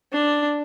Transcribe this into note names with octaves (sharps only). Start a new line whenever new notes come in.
D4